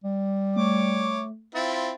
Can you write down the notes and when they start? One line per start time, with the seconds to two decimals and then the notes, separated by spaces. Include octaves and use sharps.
0.04 G3
0.56 A3 C#5 D6
1.55 C4 E4 F4 A6